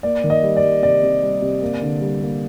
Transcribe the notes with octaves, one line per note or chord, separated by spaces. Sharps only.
A#3 D5
D#3
D#5
G3
D5
G3
C3 D5
C3
G3
C3
A#3
D3
G3
A#3